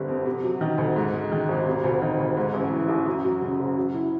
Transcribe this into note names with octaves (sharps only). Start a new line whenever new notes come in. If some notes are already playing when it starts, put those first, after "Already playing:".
Already playing: G1 D3 G3 C4
F2
C3
F#3
D#3
D2
G#2
G#3
D#3
G#1
C3
D2
D#3
D2
G#2
A1
E3
A1
F#2
F#3
C#3
F#1
F#3
E4